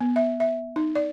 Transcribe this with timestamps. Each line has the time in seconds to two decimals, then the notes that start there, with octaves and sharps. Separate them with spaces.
0.01 B3
0.16 E5
0.40 E5
0.76 D#4
0.95 D5